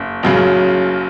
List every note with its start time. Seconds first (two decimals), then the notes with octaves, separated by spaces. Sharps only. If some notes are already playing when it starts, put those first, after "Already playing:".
Already playing: F#1
0.23 F#1 F#2 C#3 F#3